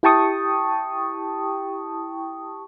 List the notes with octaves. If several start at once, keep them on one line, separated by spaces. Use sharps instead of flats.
E4 G4 G5 A5 C#6 D#6